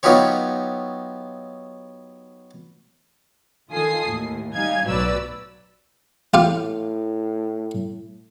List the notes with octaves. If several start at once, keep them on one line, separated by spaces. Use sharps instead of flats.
F#3 B3 D#4 F4 G4 C#5
D#3 F4 A4 G#5 D#6 C7
D#2 A2
G3 D#4 F5 G#5 G#6
B1 A2 F#3 B4 D5 E6
A2 F4 G4 F5